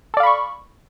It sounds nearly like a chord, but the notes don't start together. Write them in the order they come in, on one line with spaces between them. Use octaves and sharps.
A4 D5 F5 B5 C#6